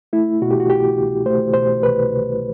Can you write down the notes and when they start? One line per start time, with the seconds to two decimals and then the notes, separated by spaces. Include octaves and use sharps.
0.13 A3 E4
0.42 B2 F#4
0.51 G4
0.60 F#4
0.70 C2 G4
0.98 C2
1.26 A3 C5
1.54 B2 C5
1.83 C2 B4
2.11 C2